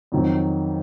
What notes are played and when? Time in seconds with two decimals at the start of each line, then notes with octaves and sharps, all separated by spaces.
0.12 F2 D#3 F#3